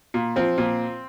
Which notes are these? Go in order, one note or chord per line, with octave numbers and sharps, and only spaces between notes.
A#2
F3 C4
A#2